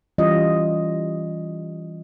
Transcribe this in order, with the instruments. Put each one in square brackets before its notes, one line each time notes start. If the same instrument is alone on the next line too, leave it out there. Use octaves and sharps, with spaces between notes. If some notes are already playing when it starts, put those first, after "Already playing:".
[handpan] E3 G3 C#4 F4 D#5